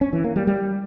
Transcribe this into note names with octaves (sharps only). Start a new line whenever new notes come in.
C#4
E3
A#3
G3
G3